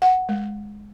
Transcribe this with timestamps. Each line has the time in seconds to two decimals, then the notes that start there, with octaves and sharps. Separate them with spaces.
0.02 F#5
0.29 G#3